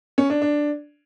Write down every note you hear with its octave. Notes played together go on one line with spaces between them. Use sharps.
C#4
D4
D4